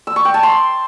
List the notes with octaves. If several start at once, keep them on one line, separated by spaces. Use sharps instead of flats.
E6
C#6
G5
A5
C6